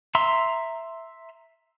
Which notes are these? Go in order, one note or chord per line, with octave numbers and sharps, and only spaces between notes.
E5 A#5 C6 E6